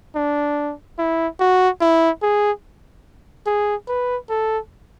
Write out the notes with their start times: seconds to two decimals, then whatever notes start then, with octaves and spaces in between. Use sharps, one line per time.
0.15 D4
0.99 E4
1.40 F#4
1.81 E4
2.23 G#4
3.46 G#4
3.88 B4
4.29 A4